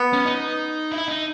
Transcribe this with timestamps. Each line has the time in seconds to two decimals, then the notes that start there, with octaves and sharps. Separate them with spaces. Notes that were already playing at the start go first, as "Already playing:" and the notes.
Already playing: B3
0.13 C#4
0.25 D#4
0.92 E4
1.08 D#4